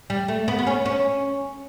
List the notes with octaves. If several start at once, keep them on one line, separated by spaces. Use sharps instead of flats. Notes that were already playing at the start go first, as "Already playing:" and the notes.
G3
A3
B3
B3
C#4
C#4